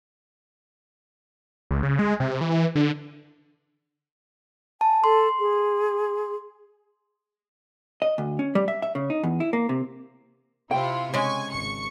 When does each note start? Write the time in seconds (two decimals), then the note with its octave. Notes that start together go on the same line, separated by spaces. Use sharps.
1.71 C#2
1.83 C#3
1.99 G#3
2.20 C3
2.41 E3
2.75 D3
4.81 G#5 A5
5.04 A4 C6
5.40 G#4
8.02 D#5
8.18 D2
8.39 C#4
8.55 G3
8.68 E5
8.82 E5
8.95 C#3
9.10 D#4
9.23 E2
9.40 E4
9.53 A#3
9.69 C3
10.71 C3 E4 F4 G5
11.14 C#3 G#3 G#5 C#6
11.52 G#1 C#6 C#7